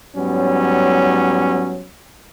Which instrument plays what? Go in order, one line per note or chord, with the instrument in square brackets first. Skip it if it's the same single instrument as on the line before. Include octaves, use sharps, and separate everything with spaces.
[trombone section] G#2 F#3 G3 B3 C#4